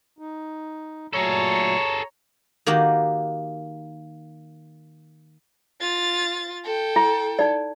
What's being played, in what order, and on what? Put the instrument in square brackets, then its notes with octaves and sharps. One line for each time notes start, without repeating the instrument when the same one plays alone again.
[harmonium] D#4
[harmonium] A#2 F#3 A3 [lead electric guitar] G#4 A4 [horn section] C#5 A#5
[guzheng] D#3 A#3 F#4 G4
[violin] F4 A6
A4 G5
[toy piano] E4
D#4 D5